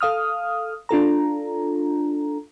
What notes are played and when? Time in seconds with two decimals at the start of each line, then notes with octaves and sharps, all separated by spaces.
0.01 A4 F5 D#6 F6
0.89 D4 F4 A4 A#5